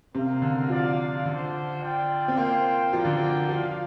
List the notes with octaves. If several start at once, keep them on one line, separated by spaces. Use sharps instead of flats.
C3 C4 A#4 F5
D3
F3 F4 D5 F5
D3 D4 F4 C5
F4 D5 G5
C4
A#3 F4 C5 G5
F3 A#3 D4 F4 D5 G5
D3
F3
F3 F4 D5 F5